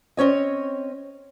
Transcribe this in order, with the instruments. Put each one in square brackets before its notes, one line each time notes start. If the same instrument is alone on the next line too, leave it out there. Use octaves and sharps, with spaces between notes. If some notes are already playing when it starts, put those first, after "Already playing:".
[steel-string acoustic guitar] C4 C#4 C#5 D#5